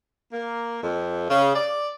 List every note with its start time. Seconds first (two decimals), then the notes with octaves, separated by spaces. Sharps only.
0.33 A#3
0.83 F2
1.29 C#3
1.55 D5